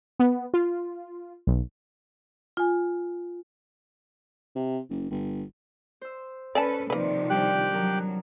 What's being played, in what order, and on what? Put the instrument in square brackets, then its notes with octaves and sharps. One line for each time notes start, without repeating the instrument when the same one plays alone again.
[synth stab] B3
F4
B1
[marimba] F4 G#5
[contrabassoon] C3
F#1
G1
[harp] C5 E6
[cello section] C#4 A4 B4 [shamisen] D5 G#5 A5
[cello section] C3 D#3 F3 [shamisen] A#3 B4 [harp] D5
[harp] G3 D4 F4 [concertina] G4 G5 F#6
[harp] F2 A#4 [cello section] F#3